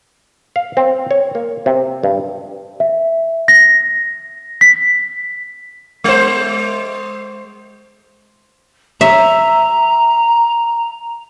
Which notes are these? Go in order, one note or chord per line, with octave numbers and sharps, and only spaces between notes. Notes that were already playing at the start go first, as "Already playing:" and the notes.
F5
C4
C#5
A#3
C3
G2
E5
A#6
B6
G#3 C5
E5 A#5